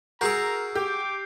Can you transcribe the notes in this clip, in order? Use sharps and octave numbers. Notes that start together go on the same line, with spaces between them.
F#4 G#4 A#4 A#5 C#6 E6 G6 C7
G4 D6